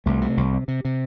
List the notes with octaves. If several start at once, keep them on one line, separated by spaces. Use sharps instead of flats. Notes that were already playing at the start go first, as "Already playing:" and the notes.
C2 A3
C3
C2
C3
C3
C3